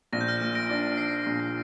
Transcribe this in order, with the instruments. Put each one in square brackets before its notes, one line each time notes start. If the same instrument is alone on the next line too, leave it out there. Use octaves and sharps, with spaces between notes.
[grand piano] A#1 [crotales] A#6
[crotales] G6
F6
G6
[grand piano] A#2
[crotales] A#6 D7
[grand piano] D4
[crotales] D7
[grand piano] D4 [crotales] C7
[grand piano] A#1
[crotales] A#6